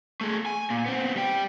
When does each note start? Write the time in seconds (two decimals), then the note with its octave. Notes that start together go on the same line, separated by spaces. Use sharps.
0.21 A3 G#4
0.46 G#5
0.70 A#2
0.86 B3 C4
1.16 G3 G5